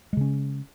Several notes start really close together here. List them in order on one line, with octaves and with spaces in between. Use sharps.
G#3 C#3 C#4